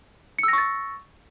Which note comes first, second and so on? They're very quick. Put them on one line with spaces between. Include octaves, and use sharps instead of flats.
C#7 E6 A#6 C#6 A6